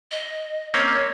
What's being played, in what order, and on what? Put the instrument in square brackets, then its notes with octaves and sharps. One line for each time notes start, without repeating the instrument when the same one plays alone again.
[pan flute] D#5
[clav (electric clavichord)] A#3 C4 C#4 [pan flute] C#5